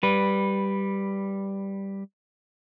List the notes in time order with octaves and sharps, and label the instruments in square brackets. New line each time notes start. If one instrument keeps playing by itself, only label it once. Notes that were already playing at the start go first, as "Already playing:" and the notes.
[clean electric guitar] G3 B4